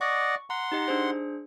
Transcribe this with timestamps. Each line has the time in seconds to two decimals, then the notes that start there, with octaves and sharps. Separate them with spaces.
0.01 D5 D#5 F#5 C#6
0.50 F#5 A#5 C6
0.72 D#4 G4 D#5
0.88 D4 G#4 C5